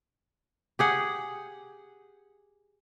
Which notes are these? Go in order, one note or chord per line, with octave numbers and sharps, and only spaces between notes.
G4 G#4 F#5